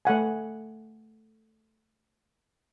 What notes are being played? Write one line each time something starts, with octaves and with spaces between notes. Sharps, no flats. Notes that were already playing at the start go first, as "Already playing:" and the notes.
A3 A4 F#5 G#5